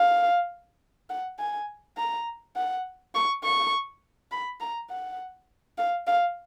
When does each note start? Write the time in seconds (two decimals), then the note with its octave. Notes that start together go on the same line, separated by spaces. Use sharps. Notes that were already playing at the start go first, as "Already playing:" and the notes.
Already playing: F5
1.09 F#5
1.39 G#5
1.97 A#5
2.56 F#5
3.15 C#6
3.43 C#6
4.31 B5
4.60 A#5
4.90 F#5
5.78 F5
6.07 F5